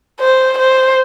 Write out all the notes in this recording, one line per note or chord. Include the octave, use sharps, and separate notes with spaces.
C5
C5